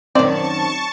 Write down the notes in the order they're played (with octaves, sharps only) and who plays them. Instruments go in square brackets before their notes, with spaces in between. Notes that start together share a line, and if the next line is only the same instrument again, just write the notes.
[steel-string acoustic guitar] F#2 D#3 [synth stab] C4 [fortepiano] D5 [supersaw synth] A5 C#6